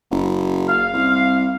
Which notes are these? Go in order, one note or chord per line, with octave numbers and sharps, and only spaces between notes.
F#1
F5
C2